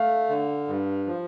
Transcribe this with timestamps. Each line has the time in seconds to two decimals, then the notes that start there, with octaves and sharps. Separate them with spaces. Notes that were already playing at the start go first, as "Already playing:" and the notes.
Already playing: A3 F5
0.29 D3
0.68 G2
1.07 F3